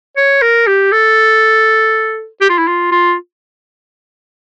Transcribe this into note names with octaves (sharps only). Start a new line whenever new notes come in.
C#5
A#4
G4
A4
G4
F4
E4
F4
F4